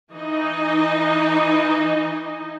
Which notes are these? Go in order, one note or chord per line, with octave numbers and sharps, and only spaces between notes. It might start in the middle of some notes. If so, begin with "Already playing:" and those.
E3 D#4 D#5